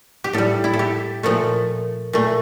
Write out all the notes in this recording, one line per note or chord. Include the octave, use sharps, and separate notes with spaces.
G4
A2 G3 A4
E4
A4
G4
A#2 F3 A3 A4
A#2 A3